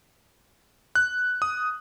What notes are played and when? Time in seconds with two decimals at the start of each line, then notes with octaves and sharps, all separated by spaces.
0.95 F#6
1.42 D#6